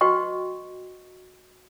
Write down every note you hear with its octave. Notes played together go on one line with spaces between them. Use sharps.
F#4 B4 D#5 G5 C#6